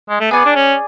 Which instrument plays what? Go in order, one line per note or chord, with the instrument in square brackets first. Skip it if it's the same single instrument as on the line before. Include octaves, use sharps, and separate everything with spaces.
[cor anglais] G#3
A3
[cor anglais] B3 [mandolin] G#4 D5 G#5
[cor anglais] D4
C#4